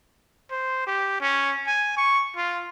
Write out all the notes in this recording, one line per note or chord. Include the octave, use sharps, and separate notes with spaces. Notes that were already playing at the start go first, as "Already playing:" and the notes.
C5
G4
C#4
G#5
C#6
F4